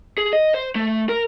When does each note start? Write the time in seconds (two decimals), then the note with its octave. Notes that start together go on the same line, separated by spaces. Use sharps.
0.18 G#4
0.33 D#5
0.54 C5
0.75 A3
1.09 A#4